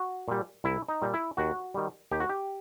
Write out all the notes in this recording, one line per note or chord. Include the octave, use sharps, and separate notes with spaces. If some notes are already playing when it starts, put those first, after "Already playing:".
Already playing: F#4
A#2 G3
C2 E4
D#4
A#2 G3
E4
D#2 F#4
D#3 G3
D#2 G4
F#4
G4